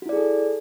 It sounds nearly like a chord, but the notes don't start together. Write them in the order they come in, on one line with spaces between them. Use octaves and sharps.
F#4 E4 D5 G#4 A4